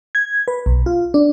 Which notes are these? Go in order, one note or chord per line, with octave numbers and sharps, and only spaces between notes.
G#6
B4
B1
F4
D4